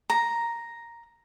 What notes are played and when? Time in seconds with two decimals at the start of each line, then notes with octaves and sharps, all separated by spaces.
0.10 A#5